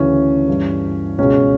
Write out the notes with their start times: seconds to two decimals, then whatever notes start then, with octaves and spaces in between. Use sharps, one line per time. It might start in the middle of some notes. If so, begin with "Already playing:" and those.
Already playing: D2 C#3 E3 C#4
0.48 G2 E3
1.18 C#2 B2 C#4